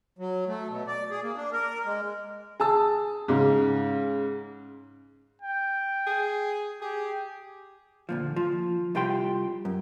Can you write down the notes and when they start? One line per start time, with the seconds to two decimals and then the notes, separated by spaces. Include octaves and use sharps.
0.19 F#3
0.48 A3
0.69 B2
0.87 D5
1.11 G#4
1.23 A#3
1.36 D4
1.53 A#4
1.85 G#3
2.60 G#4 A5 E6
3.28 G#2 C#3
5.42 G5
6.06 G#4
6.82 G4 G#4
8.09 D2 A#2 F3
8.36 F3
8.95 C2 F4 G4 G5 C6
9.65 F#2